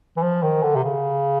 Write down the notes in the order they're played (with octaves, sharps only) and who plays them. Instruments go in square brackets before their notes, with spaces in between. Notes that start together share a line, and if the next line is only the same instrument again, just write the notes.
[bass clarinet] E3
F3
D#3
D3
C3
C#3